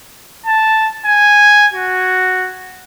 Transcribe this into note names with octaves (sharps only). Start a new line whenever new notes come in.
A5
G#5
F#4